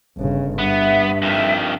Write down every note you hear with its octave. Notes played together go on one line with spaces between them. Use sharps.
G1 C#3
G2 B3 E5
F2 D#3 E5